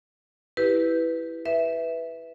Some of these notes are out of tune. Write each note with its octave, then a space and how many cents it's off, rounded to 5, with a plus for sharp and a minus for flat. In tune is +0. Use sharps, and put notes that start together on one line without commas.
E4 +0 G4 +0 B4 +0
B4 +0 E5 +0